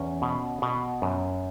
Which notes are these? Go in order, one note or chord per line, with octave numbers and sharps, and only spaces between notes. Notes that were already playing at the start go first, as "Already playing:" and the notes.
Already playing: E2 C#4
B2
B2
F#2